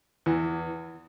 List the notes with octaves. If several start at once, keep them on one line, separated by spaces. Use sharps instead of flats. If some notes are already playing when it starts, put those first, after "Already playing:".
E2 E3